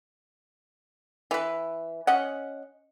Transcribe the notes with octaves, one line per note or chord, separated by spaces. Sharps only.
E3 B4
C#4 D#5 F#5